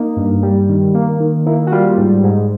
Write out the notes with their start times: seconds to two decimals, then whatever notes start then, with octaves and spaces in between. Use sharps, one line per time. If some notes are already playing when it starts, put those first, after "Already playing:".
Already playing: A#3 D#4
0.17 G2
0.43 G3
0.69 D#3
0.94 A#3
1.20 D#3
1.46 A#3 E4
1.67 F#4
1.72 G3 F4
1.97 G#2
2.23 G#2